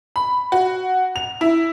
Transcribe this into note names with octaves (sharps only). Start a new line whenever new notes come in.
B5
F#4
F7
E4